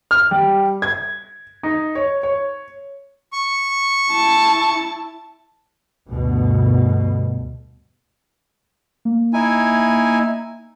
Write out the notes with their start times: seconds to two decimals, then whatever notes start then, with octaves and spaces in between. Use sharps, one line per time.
0.11 F6
0.31 G3
0.82 G#6
1.63 D#4
1.95 C#5
2.23 C#5
3.33 C#6
4.12 E4 A5
6.09 D2 G2 B2
9.05 A#3
9.33 D#4 E4 G#5